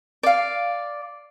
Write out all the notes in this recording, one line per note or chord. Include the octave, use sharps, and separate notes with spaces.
D5 F5